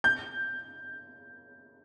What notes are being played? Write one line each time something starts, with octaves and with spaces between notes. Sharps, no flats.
G6